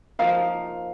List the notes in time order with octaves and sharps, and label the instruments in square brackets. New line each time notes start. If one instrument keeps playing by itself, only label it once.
[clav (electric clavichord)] F3 A#3 D#4 [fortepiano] F5